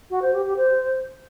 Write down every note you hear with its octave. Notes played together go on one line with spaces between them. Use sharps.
F#4
C5
G4
G4
C5